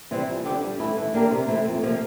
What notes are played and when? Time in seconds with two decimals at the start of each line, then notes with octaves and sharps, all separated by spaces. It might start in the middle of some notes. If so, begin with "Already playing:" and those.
0.11 C3 E3 G3 C4
0.28 F2
0.45 D3 G3 D4 G4
0.62 G2
0.80 E3 A3 E4
0.97 E3
1.14 A#3 D4 G4 A#4
1.31 C3
1.48 E3 A3 C4
1.65 F2
1.83 C3 F3 A#3